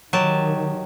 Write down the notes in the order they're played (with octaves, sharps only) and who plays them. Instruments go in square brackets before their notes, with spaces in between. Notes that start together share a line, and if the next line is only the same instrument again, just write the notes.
[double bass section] D#3 [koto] F#3 G4 A5